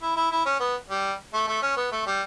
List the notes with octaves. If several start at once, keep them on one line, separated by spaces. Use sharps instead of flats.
E4
E4
E4
C#4
B3
G3
A3
A3
C#4
B3
A3
G3